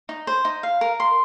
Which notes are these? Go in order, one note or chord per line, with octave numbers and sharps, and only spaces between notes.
D#4
C5
D#4
F5
A#4
C6